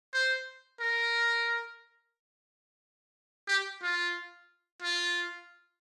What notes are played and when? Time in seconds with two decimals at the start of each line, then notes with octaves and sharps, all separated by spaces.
0.13 C5
0.80 A#4
3.48 G4
3.82 F4
4.82 F4